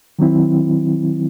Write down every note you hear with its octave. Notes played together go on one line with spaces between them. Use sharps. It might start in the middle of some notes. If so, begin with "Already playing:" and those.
D#3 F#3 C4 E4